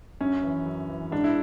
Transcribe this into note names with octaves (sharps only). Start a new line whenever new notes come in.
F#2 C#4
E3
F#2
E3
G#2 D4
E4